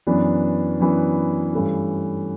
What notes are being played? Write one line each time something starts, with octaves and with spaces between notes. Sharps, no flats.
F#2 E3 B3 D4
F#2 E3 B3 D4
G2 E3 A3 C#4